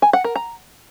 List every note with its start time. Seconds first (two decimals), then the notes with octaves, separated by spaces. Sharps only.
0.02 G#5
0.13 F#5
0.24 A#4
0.36 A#5